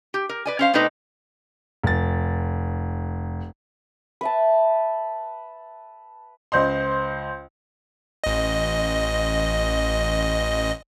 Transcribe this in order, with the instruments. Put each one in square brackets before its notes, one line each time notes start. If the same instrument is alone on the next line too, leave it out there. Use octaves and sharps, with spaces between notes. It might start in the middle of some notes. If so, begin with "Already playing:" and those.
[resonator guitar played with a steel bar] G4
A#4
B4 D5 G#5
C#4 C5 F5
B2 A3 C4 D4 D#4 B4
[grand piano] F1 A6
[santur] B4 E5 A5
[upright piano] C#2 C5 D#5 C6
[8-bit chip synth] A1 D#5